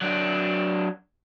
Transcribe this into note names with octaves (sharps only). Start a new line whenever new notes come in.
F#3 D4